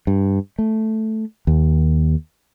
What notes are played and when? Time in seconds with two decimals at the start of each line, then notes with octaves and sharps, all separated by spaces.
0.07 G2
0.58 A3
1.47 D#2